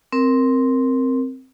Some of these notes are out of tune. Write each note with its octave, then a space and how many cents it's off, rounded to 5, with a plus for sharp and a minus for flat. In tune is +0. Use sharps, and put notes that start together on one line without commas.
C4 +0 A#4 +0